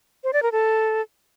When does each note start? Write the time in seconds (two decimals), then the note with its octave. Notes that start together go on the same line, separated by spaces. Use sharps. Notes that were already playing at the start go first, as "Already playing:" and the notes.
0.24 C5
0.33 D5
0.43 A#4
0.52 A4